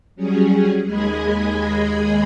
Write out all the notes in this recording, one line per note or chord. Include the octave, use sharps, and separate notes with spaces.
F#3 G3 C#4 G#4
D#2 G#3 G#4 D#5 B5 G#6